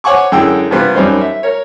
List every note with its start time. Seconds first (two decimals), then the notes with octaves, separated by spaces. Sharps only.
0.04 C5 C#5 F#5 G#5 C#6 D6
0.32 F#2 D3 G#3 E4 G5 E6
0.71 G2 C3 B3 C4 F4
0.95 F#2 G3 D#4 C5
1.21 E5
1.43 A#4 C#5